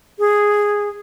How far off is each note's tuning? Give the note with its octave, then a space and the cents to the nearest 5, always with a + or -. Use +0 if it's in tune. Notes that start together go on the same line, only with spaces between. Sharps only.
G#4 -5